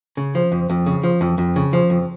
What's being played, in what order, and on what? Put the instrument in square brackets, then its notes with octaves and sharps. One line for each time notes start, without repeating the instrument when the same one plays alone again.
[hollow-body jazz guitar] C#3
F3
F2
F2
C#3
F3
F2
F2
C#3
F3
F2